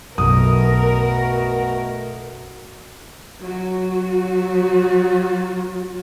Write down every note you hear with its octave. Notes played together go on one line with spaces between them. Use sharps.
B1 F#2 B2 A3 F#4 A#4 D#6
F#3 F#4